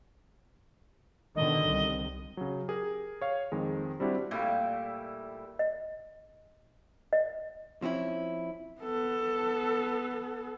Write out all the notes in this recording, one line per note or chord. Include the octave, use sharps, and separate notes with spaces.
B2 D3 D#3 D#5
C2
C#3 F#3
G4 G#4 A#4
C#5 F5
F2 D#3 G#3
G3 C4 D4 E4 F#4 G4
A#2 G3 A3 E4
D#5
D#5
F3 C4 C#4 E4
B3 A4